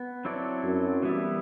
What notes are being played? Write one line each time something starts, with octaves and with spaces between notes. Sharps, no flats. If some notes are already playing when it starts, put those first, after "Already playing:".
Already playing: B3
F#3 C4 E4 A4 D5
F#2
E3 G3 B3 E4